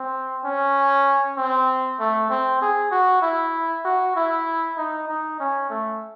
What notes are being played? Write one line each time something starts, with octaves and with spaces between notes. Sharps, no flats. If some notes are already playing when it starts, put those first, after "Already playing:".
Already playing: C4
C#4
C4
A3
C4
G#4
F#4
E4
F#4
E4
D#4
D#4
C#4
A3